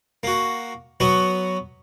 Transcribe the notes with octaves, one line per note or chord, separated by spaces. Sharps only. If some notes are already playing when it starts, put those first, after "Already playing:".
A#3 F#4
F#3 B3 F#4